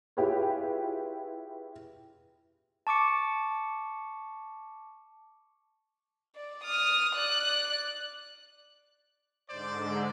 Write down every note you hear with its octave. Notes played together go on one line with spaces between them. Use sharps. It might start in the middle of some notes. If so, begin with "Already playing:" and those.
E4 F4 G4 G#4 B4 C#5
A5 C#6 D6 C#7
D5
D#6 F6
D5 F#6
G#2 D3 C5 D5